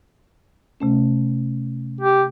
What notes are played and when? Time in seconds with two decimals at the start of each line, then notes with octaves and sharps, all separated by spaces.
0.80 C3 A3 C#4
2.01 G4